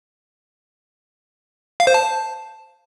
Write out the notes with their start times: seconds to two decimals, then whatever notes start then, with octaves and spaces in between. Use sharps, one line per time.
1.80 F5
1.87 C5
1.94 A5